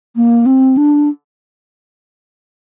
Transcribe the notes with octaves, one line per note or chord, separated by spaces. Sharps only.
A#3
C4
D4